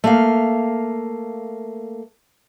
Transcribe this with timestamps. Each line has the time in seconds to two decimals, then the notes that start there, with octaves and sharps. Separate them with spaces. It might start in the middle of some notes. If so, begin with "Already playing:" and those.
0.04 A3 A#3 F5